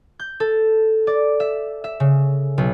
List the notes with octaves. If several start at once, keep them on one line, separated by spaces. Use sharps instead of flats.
G6
A4
D5
E5
E5
C#3
B1